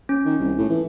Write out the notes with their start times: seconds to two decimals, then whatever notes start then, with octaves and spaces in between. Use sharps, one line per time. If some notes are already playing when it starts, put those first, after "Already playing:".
0.09 C#4
0.26 D#3
0.40 C2
0.58 A2
0.70 E3